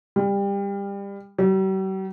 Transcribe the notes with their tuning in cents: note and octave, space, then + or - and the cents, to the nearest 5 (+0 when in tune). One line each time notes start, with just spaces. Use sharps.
G3 +25
G3 -45